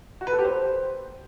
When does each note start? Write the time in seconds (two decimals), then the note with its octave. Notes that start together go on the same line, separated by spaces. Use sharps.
0.21 F#4
0.27 B4
0.33 A4
0.39 G4
0.45 C5